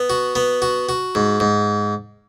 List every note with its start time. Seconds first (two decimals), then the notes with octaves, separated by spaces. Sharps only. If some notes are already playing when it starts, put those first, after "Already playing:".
Already playing: B3
0.10 F#4
0.35 B3
0.62 F#4
0.89 F#4
1.15 G#2
1.40 G#2